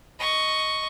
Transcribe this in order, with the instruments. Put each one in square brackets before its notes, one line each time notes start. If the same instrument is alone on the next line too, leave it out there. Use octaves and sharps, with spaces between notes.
[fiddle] D#5 C#6